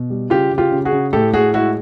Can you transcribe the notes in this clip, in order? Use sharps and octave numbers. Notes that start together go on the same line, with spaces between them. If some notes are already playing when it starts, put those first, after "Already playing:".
Already playing: B2
G3
C#3 F4 G4
C#3
F4 G4
C#3
F#4 G#4
C#3
A2 G4 A4
A2 F#4 G#4
G#3 E4 F#4